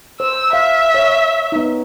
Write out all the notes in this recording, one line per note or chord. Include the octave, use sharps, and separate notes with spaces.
C5 E6
E5 F5
C#5
B3 D#4